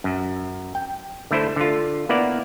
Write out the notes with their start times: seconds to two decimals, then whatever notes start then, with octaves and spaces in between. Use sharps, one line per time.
0.04 F#2
0.75 G5
1.31 D3 A3 E4 C5
1.56 D3 F4
2.09 A#3 B3 E4 D5